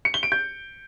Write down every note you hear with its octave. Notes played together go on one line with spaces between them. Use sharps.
C#7
G7
D7
G6